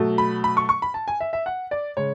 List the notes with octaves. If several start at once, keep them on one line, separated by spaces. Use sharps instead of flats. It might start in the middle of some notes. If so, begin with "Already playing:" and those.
Already playing: B2 F#3 A3
B5
B5
C#6
C#6
B5
A5
G#5
E5
E5
F#5
D5
C#3 G#3 C#5